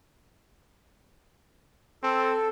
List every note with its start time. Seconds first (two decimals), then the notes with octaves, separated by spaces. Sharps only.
2.03 C4 A4